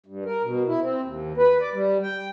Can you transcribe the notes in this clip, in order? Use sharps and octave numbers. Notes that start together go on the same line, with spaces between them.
G2
A#4
B2
E4
C4
D#2
B4
D5
G3
G5